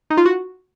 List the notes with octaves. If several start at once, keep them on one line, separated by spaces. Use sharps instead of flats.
D#4
F4
F#4